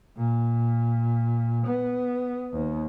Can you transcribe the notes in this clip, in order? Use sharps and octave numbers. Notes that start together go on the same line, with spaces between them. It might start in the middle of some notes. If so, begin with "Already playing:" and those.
A#2
B3
D#2